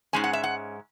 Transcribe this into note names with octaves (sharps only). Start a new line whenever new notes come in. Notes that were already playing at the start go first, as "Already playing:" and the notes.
G#2 G#3 C#4 G#5
F#5
E5
F#5